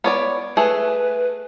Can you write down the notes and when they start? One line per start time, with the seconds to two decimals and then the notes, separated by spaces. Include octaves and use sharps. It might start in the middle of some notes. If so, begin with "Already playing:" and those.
0.04 B3 C#5 D5
0.57 A3 G#4 B4